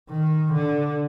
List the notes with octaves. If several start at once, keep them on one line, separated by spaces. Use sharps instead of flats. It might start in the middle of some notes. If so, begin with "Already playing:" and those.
D#3
D3